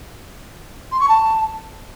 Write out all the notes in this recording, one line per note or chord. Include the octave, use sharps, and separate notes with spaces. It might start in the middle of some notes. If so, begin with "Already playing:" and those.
C6
C#6
A5